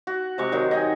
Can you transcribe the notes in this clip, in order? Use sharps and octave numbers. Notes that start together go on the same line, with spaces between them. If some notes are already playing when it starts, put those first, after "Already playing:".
F#4
C3 G#3 C#6 D6
D#3 F#3 D#4
D#5 G5 G#5